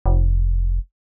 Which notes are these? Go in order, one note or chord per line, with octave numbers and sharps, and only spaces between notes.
F1